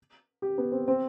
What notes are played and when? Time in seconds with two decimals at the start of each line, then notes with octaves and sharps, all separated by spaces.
0.42 G4
0.58 B3
0.72 C4
0.88 C4